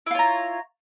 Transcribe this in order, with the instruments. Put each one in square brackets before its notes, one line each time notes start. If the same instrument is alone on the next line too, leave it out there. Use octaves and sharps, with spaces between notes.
[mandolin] E4
F4
C#5
A#5